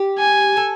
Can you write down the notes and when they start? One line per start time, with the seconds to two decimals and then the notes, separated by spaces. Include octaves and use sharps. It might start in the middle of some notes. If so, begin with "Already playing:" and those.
Already playing: G4
0.19 G#5
0.57 A4